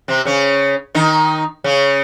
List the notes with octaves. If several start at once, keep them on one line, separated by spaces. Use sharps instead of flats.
C3 C4
C#3 C#4
D#3 D#4
C#3 C#4